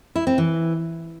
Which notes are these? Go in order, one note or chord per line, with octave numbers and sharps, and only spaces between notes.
E4
C4
E3